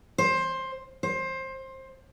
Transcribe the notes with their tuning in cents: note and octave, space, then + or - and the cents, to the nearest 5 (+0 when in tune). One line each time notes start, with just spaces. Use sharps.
C5 +15
C5 +20